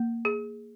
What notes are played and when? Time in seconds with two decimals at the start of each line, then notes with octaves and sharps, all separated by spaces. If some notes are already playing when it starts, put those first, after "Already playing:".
Already playing: A#3
0.25 G#4